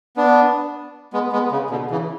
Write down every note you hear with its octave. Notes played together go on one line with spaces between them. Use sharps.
B3 D4
G#3 B3
G#3 B3
C#3
B2 D3
C#3 E3